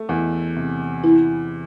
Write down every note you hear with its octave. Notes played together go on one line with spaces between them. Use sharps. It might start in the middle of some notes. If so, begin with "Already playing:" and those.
Already playing: A3
E2
C3
E3 E4